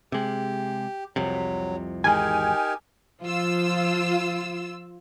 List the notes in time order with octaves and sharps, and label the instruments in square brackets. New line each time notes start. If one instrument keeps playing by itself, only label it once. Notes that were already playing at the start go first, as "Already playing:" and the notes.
[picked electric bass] C3 G#3 [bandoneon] G4
[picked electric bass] C2 F2 C3 [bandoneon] F#3
[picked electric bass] G#1 E2 G#3 [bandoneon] D#4 G4 A#4 [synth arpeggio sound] G#5
[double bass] F3 [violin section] F4 E6